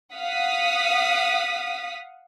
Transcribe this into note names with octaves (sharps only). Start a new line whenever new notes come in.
F5 F#5 D#6 B6